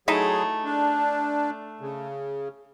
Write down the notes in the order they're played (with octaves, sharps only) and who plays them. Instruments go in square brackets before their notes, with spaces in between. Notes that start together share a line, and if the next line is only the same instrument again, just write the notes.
[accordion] F#3 G#4 [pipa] A3 D#4 E4
[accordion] D4
C#3